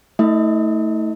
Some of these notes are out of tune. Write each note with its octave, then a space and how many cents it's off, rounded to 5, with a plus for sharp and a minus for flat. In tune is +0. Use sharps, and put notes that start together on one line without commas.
A3 +10 E4 -45 E5 -40